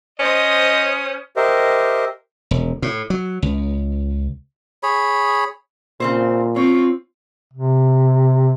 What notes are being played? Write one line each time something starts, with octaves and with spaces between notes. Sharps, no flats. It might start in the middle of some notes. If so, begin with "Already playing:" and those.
C#4 C5 D#5 D#6
G4 A#4 C5 D#5 E5
E1
A2
F#3
C#2
G#4 C#5 B5
A#2 C#3 C4 C5
C4 F4 C#5
C3